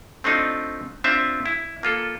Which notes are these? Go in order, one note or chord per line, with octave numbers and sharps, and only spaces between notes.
A3 C4 D4 D#4 F4
C4 D4 F4 E5
E4
A#3 F4 A4